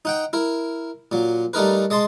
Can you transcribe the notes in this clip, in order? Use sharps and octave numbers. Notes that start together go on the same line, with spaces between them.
D#4 F#5 G5
E4 A#4
A#2 F#3
G3 A3 D#4 A#4 B4
G#3 D#5 A5 C6